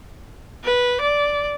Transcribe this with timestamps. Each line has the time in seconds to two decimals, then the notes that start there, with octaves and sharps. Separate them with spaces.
0.64 B4
1.01 D5